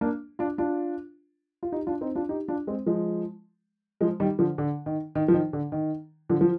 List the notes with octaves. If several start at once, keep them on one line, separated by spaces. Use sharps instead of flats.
A#3 D4
D4 F4
D4 F4
F4
D#4 G4
D4 F4
C4 D#4
D4 F4
D#4 G4
D4 F4
G#3 C4
F3 G#3
F3 G#3
D#3 G3
D3 F3
D3
D#3
D#3
F3
D#3
D3
D#3
D3 F3
F3